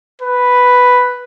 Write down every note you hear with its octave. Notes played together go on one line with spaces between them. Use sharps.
B4